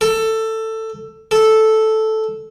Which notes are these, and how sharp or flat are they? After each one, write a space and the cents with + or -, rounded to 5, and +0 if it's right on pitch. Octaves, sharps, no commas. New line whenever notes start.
A4 +15
A4 -5